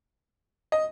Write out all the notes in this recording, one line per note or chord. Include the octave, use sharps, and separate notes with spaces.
D#5